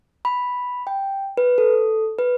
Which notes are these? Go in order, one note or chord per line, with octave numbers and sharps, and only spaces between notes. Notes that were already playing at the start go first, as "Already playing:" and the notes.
B5
G5
B4
A4
B4